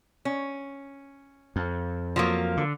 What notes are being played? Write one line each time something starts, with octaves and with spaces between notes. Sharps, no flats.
C#4
F2
F3 F#3 A#3
D3